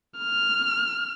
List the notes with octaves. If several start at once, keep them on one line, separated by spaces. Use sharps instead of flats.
F6